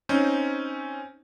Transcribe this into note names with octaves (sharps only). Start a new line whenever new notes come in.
C4 C#4 D#4 C5